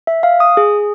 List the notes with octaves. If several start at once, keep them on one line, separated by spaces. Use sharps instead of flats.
E5
F5
D#6
G#4